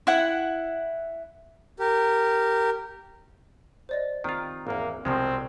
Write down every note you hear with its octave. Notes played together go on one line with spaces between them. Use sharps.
E4 F#5
G4 A#4
C5 D5 D#5
D#3 C4 F4 G4 A#5
G#1 E2 A#3
C2 B2 F3 G#3 C4